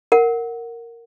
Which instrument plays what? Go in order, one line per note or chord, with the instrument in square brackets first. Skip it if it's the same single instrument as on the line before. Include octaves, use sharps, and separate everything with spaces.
[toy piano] A#4 F#5